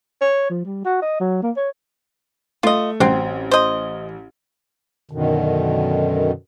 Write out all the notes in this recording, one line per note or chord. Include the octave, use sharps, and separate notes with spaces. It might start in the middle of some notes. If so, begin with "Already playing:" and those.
C#5
F3
G3
F#4
D#5
F#3
A#3
C#5
A3 F4 D#5
A1 F#3 C4
C5 D#5
F#2 B2 D3 D#3